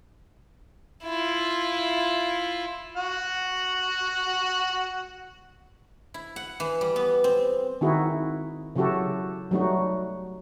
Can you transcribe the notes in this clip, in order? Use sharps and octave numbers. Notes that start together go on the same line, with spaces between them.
E4 F4
F#4 F#5
E4
F#5
E3
G3
B3
C4
D#3 C4 D#4 E4 F#4 G#4
C#3 F#3 E4 F#4 G4 A4
F#3 G3 A3 D#4 F#4